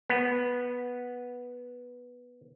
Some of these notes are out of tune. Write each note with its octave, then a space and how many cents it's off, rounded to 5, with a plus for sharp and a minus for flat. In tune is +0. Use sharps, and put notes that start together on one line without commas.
B3 -5